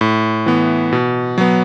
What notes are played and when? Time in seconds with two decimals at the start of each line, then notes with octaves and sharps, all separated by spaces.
0.01 A2
0.46 E3 B3
0.92 B2
1.38 F#3 B3